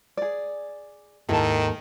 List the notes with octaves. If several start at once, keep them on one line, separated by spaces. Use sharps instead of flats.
G#4 D5
D#2 G#2 D#3 E4 A4 D#5 A5